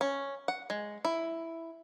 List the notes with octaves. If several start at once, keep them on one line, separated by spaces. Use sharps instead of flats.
C#4
F#5
G#3
E4